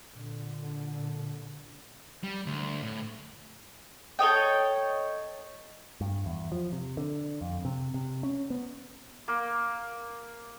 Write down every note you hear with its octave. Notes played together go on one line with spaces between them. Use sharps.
A#2 D3
G3
D2
A2
A4 C#5 D#5 G5
G2
E2
F3
C3
D3
F2
C3
C3
C#4
B3
A#3